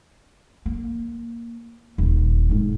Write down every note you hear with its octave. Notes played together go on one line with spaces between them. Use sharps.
A#3
D#1
G#2 C3